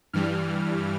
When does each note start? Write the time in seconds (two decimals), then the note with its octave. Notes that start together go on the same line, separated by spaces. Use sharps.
0.13 G2 E3 G3 F6